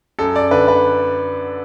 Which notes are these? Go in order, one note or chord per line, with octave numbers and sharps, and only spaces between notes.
F#2 A4
D5
D3 B4
B4